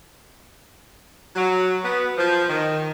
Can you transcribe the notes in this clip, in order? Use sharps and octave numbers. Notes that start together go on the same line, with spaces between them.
F#3
B3
F3
D#3